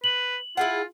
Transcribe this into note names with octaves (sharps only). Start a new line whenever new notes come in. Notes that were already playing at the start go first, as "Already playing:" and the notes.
B4 F#7
E4 F4 G#4 F#5